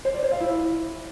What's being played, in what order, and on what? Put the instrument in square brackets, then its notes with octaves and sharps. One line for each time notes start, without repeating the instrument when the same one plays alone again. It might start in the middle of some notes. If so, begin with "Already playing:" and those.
[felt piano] C5
D5
C5
F5
E4